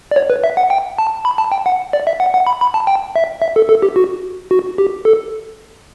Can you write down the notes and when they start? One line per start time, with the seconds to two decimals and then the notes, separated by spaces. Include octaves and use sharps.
0.11 D5
0.16 C#5
0.30 B4
0.44 E5
0.57 F#5
0.70 G5
0.98 A5
1.25 B5
1.38 A5
1.52 G5
1.66 F#5
1.93 D5
2.07 E5
2.20 F#5
2.34 F#5
2.47 B5
2.61 B5
2.74 A5
2.87 G5
3.16 E5
3.42 E5
3.56 A4
3.69 A4
3.82 G4
3.96 F#4
4.51 F#4
4.78 G4
5.05 A4